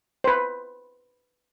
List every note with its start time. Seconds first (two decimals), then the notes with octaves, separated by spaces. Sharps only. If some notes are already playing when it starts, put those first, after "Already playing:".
0.24 B4 C5